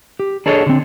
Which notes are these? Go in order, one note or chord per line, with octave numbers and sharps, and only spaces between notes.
G4
D4 G#4 A4 C#5 D#5
D3 C4